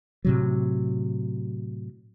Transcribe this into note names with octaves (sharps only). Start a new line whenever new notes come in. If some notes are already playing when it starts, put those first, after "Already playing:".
A2 C3 F#3